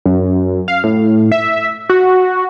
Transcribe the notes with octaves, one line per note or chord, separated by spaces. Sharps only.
F#2
F5
A2
E5
F#4